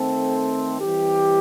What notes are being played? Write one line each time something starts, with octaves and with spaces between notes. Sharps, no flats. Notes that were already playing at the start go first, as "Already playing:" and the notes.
Already playing: D#3 A3 C4 A4
E3 G3 C4 G4